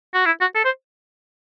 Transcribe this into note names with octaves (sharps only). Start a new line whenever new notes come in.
F#4
E4
F#4
A4
C5